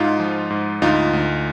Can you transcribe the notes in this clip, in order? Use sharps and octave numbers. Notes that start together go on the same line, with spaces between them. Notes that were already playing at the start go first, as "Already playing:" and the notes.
Already playing: G#2 D#4 F4
F3
G#2
D2 D#4 F4
D2